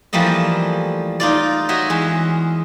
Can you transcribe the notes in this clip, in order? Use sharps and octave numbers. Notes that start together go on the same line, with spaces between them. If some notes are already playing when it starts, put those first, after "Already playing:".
E3 F3 G3 A3 A#3 D#5
D#4 F4 D5
F#4 C#5 D#5 E5
E2 G#3